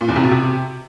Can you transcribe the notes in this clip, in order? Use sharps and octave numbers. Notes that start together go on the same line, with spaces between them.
A#2
E2
C3
B2
C3